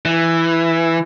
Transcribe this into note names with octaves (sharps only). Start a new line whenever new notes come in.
E3